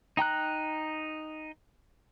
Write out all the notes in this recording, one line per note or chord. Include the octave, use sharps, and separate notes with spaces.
D#4 G5 A#5 F#6